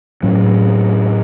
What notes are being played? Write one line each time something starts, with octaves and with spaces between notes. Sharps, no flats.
A2 F#3 C#4